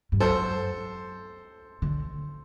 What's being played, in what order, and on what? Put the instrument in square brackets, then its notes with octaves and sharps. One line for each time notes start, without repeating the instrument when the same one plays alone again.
[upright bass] G2
[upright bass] F#2 [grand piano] A4 C5
[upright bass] D3